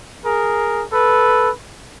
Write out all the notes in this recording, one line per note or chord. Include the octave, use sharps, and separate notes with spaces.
G#4 A#4
A4 B4